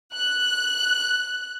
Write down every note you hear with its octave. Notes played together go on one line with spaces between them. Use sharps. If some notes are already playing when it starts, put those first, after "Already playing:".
F#6